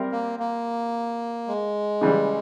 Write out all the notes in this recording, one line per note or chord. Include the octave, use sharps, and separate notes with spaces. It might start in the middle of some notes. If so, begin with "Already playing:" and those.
Already playing: G3 C4 G4 A#4 E5
A#3
A#3
G#3
C#3 E3 G3